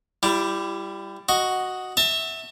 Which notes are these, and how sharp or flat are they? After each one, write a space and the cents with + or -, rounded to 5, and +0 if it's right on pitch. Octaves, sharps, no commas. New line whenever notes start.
G3 +0 E4 +30
F#4 +0 D#5 +0
E5 -15 A5 +30